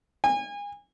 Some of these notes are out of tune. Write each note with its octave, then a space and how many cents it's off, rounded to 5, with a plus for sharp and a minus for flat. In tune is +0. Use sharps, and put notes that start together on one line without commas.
G#5 -30